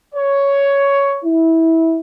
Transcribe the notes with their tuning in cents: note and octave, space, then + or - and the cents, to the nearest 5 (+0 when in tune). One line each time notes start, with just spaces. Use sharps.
C#5 +10
E4 -20